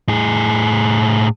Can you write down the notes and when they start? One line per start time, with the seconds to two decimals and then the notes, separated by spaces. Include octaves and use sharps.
0.08 A2 G#4